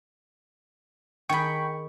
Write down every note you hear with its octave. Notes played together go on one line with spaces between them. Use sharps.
D#3 G#4 G5 B5 C#6